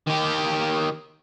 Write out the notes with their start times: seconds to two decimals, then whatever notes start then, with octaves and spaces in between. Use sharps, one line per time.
0.07 D#3 G4